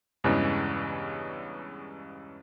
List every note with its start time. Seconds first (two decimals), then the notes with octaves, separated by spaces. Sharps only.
0.24 E2 G2 C#3 E3 G#3